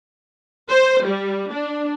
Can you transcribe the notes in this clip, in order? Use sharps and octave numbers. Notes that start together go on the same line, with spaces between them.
C5
G3
D4